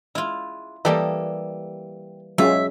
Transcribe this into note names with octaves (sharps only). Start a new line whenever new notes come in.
G#3 E4 F4
E3 G3 A#3 G4 A4 D#5
F#3 G#3 C#4 F4 E5